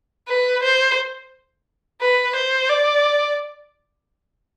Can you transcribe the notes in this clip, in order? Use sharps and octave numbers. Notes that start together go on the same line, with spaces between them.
B4
C5
B4
C5
D5